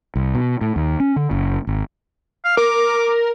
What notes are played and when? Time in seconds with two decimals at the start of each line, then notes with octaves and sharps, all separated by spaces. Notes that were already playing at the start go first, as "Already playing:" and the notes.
0.15 C2
0.35 B2
0.61 A2
0.76 D#2
1.00 C#4
1.16 D3
1.31 F#1
1.67 G#1
2.45 F5
2.57 A#4 D6